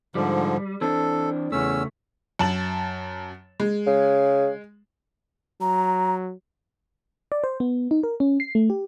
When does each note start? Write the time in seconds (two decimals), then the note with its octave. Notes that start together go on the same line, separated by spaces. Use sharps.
0.15 G#2 D3 F3 G3
0.81 E3 C4 D4 A4
1.52 E2 C#3 A3 C#4 E6
2.39 F#2 A5 F#7
3.60 G#3
3.87 C#3
5.61 F#3 A#5
7.32 D5
7.44 C5
7.60 B3
7.91 D#4
8.03 A#4
8.20 C#4
8.40 C7
8.55 A3
8.70 G4